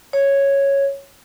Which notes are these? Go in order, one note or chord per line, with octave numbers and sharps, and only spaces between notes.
C#5